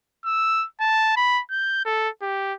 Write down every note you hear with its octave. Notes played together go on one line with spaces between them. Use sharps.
E6
A5
B5
G6
A4
G4